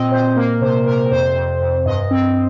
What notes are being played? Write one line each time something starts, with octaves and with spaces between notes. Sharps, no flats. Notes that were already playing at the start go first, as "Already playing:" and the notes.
Already playing: A#2 C4 D#5
A#2 C5
A#3 A#4
C3 C5
C3 A#4
F2 C5
F2
F2
G2 D#5
C4